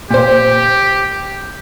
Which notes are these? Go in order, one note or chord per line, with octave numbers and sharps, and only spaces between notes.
A#2 G4 C5